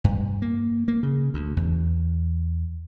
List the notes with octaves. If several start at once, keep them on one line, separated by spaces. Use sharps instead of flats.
G2
A#3
A#3
C#3
D2
E2